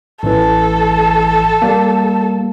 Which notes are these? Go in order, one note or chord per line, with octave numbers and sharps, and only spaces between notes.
A1 E3 A4
G3 A#3